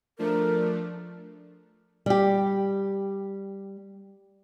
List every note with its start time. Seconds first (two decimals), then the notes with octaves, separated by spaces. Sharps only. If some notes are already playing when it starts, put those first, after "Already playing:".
0.19 F3 A3 D4 A#4
2.06 G3 G4